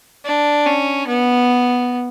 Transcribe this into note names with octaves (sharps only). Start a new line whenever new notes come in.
D4
C#4
B3